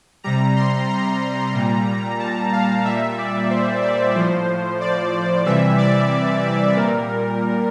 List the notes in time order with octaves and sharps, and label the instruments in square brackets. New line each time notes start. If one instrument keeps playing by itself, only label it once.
[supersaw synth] C3 G3 A#5
C6
A#5
A#2 G3
A5
F5
A#2 G3 E5
D5
C5
D5
A2 F3 C5
D5
C3 E3 G3 E5
D5
A#2 G3 A#4